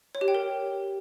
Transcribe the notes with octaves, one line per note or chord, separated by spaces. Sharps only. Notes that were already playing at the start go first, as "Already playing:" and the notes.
C#5
G4
G5
A#4